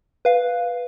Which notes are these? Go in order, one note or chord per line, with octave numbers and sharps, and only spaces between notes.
B4 F5